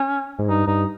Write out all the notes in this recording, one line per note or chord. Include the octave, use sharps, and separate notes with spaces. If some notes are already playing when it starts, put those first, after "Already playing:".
Already playing: C#4
G#2
G2 D#4
G2 D#4